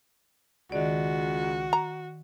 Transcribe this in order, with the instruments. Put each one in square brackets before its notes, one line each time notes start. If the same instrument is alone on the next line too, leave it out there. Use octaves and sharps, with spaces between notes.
[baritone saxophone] C#2 [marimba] D#3 D5 [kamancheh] F#4
[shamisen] A#5